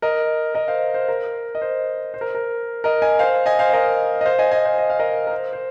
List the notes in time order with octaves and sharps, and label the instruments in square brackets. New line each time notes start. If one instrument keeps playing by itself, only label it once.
[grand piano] A#4 D#5
A#4 D#5
C5 F5
C5
A#4
D#5
C5
C5
A#4
A#4
A#4 D#5
D#5 G#5
C5 F5
D#5 G#5
C5 F5
A#4 D#5
D#5
C5 F5
D#5 G#5
D#5 G#5
C5 F5
D#5
F5
A#4 D#5
A#4
C5
C5